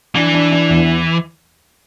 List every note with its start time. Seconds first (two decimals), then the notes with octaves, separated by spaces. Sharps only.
0.15 E3 D4
0.34 D4
0.52 D4
0.69 E2